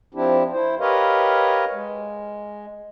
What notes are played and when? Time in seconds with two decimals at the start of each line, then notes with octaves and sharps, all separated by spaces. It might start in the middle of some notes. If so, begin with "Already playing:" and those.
0.14 F3 C4 D4 E4 G4
0.52 E4 C5
0.80 G4 A#4 B4 C#5 D#5 F5
1.73 G#3